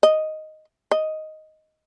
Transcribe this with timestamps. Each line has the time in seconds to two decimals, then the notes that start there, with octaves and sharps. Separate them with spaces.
0.03 D#5
0.91 D#5